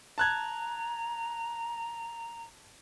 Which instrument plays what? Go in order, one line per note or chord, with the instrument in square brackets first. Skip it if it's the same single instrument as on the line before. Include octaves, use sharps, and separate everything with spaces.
[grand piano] A5 F#6 G#6 [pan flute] A#5